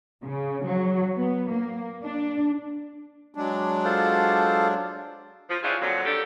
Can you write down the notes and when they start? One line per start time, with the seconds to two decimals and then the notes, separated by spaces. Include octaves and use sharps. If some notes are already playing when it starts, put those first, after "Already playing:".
0.23 C#3
0.66 F#3
1.16 B3
1.50 A#3
2.04 D4
3.34 F#3 G#3 D4
3.85 F4 A4 C5
5.49 F3
5.63 G3 C#4 D4 E4 F4 G#4
5.81 F2 A#2 D3 F3 F#3
6.05 D#3 D4 G4 A4